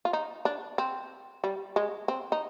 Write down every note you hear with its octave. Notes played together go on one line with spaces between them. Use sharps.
F4
D#4
D4
C4
G3
G#3
C4
D#4